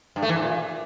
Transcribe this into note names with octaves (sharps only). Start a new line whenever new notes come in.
G2
A3
E3
G#2
A#2